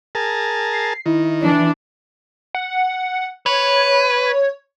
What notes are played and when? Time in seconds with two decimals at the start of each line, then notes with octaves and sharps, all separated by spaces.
0.15 G#4 A#4 A5
0.73 C7
1.06 D#3 E4
1.44 E3 D4
2.55 F#5
3.46 B4 C#5